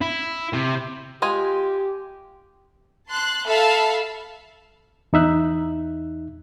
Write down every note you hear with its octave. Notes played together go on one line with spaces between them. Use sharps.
E4
C3
G#3 F4 G4 G#5
A5 C6 F#6
A4 E5 F5 A5 B5
E2 D#4 E5 F#6